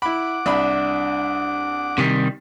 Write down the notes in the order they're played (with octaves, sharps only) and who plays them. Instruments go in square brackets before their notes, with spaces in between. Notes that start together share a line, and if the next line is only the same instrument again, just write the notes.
[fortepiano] E4 B5 [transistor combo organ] F#5 D6
[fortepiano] C2 B5 [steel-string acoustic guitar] D4 E5
[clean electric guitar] C3 D#3 G3